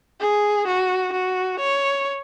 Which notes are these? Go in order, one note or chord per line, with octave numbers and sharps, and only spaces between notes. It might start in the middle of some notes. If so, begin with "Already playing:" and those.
G#4
F#4
F#4
C#5